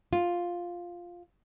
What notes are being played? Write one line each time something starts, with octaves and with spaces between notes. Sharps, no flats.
F4